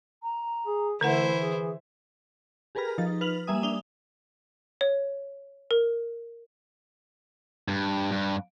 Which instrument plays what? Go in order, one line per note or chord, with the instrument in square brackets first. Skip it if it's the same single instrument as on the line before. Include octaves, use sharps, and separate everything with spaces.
[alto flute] A#5
[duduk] G#4
[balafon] D3 B4 F#5 [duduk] E3 [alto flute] A3 [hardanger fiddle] E4 C5
[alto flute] G#4
[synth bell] G4 G#4 A#4 B4 A#5 F6
F3 D#4 A6
B4 F6 F7 F#7
G3 A#3 E5 G#5 D#6
D4 D#6 F7 G7
[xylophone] C#5
A#4
[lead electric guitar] G2
G2